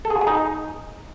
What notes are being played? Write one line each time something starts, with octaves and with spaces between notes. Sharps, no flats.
A4
G#4
F#4
G#4
D#4